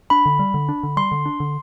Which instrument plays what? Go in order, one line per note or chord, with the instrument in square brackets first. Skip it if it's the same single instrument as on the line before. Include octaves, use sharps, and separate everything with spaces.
[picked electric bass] D4 [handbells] B5
[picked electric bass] D3
G3
D3
D4
D3
[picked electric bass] G3 [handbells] C6
[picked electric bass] D3
D4
D3